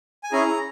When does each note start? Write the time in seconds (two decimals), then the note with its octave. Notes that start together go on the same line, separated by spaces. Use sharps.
0.23 G#5
0.32 C#4 E4 G#4 A#5